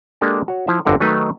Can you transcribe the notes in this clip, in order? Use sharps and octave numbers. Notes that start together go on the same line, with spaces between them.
G#3 A#3 D4 G4 A4 A#4
F#4 C#5
F3 E4 C5 E5
G1 F2 D3 C4 A#4 F#5
D#3 F#3 A3 D#4 B4 D#5